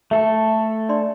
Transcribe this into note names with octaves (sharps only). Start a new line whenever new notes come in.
A3 A4 E5
D4 D5 C6